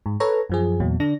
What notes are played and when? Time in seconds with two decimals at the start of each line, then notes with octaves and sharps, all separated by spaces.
0.06 G#2
0.20 A4 B4 C#5 A#5
0.50 F#2 F3 G#4
0.80 E2 A#2 F#3
1.00 D3 D4 A#6